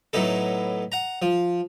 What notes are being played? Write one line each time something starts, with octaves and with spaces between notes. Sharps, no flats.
A2 F#3 B3 D#4 A4
F#5 A#5
F3